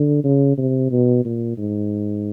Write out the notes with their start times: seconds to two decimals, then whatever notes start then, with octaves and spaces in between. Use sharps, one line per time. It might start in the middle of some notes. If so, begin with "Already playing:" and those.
Already playing: D3
0.24 C#3
0.58 C3
0.91 B2
1.25 A#2
1.58 G#2